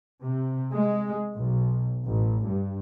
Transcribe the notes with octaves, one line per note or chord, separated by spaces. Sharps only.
C3
G#3
B1
A1
G2